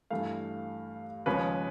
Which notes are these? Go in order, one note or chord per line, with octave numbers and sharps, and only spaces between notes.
G2 E3 A3 F5
D#2 C#3 F3 G#3 C#4 B4